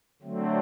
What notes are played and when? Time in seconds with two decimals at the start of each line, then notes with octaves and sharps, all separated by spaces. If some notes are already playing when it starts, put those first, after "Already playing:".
0.22 D3 F#3 A3 C4